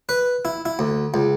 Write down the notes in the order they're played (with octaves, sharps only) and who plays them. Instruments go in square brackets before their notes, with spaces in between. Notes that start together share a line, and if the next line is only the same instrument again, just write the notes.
[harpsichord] B4
E4
E4
D2
C#2